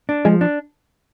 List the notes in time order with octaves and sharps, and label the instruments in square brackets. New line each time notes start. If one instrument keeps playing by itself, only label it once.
[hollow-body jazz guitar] D4
[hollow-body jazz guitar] F3 [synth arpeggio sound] G#3
[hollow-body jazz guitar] D4